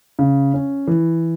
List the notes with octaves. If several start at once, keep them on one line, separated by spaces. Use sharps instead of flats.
C#3
C#4
E3